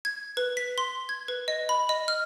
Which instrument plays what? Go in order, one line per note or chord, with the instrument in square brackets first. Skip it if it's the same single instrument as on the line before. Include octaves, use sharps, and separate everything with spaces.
[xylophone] G#6
B4
B6
C6
G#6
B4
D#5
B5
D#5
F6